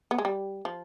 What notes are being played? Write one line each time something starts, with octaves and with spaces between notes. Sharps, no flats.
B3
G#3
G3
F3